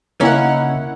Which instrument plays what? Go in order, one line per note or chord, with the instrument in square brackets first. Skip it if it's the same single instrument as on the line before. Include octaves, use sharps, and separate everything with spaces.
[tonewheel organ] C#3 [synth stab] A#3 E4 F#5 [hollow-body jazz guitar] C#4 [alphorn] D#4